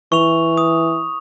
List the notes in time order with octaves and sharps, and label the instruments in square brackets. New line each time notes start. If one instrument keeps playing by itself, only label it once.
[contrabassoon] E3 [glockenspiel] C#6 F7
[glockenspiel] D#6